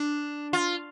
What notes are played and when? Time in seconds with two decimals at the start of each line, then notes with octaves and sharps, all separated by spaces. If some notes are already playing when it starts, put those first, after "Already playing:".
Already playing: D4
0.53 F4